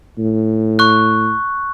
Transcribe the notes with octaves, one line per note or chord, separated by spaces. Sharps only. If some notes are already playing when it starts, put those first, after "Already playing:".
A2
C#6 F#6